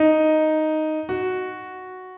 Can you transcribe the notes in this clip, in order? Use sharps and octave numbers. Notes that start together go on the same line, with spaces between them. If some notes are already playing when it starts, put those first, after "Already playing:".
Already playing: D#4
F#4